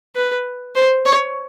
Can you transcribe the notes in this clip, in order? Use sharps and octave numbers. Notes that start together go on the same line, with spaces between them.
B4
C5
C#5